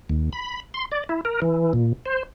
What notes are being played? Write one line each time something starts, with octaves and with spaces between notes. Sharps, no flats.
D#2
B5
C6
D5
E4
A#4
E3
A#2
C5